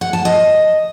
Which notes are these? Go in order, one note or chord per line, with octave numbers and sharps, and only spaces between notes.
F#5
A5
D#5